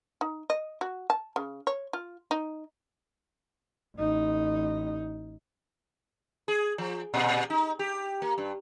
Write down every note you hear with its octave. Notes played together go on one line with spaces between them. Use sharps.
D#4
D#5
F#4
A5
C#3
C#5
F4
D#4
A1 D#4
G#4
F3
A#2
D#4
G4
A#3
G2